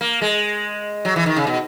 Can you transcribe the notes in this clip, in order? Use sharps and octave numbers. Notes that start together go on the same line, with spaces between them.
A#3
G#3
F#3
E3
D#3
C#3
B2